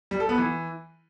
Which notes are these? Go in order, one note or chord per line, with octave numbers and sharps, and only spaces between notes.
G3
A4
B3
E3